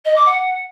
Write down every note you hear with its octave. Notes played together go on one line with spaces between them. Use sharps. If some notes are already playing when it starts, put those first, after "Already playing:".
D#5
D6
F#5